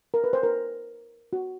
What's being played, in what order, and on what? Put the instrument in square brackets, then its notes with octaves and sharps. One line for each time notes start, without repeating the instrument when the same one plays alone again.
[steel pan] A#4
B4
C5
A#4
F#4